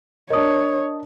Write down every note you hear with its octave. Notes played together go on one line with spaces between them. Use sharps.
D4 A#4 C#5 D#5 D#6